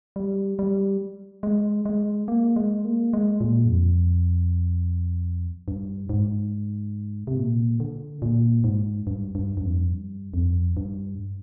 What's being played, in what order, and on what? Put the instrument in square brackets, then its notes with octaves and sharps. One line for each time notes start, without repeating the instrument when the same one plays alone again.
[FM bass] G3
G3
G#3
G#3
A#3
G#3
A#3
G#3
A#2
G2
F2
G2
G#2
C3
A#2
D3
A#2
G#2
G2
G2
G2
F2
G2
F2
G2